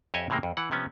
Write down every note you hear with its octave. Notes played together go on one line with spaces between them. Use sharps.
F2 G4 C#5 D#5 E5 G#5
A2 C3 E3 G#3 A#3
F2
E3 F#5
C3 F3 B3 C#4